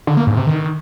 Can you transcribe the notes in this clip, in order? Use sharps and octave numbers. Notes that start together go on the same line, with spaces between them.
D3
A#3
G#2
C3
D#3